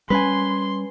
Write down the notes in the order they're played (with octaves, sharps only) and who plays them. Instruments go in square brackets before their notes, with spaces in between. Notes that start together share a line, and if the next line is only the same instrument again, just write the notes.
[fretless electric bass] G3 C#4 [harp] B4 G#5 [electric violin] C6